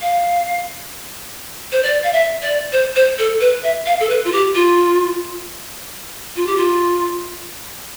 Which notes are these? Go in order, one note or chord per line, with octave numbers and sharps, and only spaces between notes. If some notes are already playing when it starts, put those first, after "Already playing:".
F5
C5
D5
F5
E5
D5
C5
C5
A4
B4
E5
F5
A4
B4
F4
G4
F4
F4
G4
F4